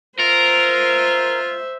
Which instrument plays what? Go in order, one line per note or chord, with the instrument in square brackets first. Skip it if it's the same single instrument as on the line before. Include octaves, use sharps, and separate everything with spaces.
[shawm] F4 [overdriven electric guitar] A#4 [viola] C5 E5